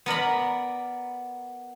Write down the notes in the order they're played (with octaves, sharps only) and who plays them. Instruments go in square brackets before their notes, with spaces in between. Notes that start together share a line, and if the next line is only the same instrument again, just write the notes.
[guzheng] B3 A#4 D5 B5